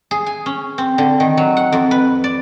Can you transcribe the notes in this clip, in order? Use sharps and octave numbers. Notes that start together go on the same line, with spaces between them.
G#4
G#5
C#4
C4
D3
D#3
F#3
F#5
F2
B4
D5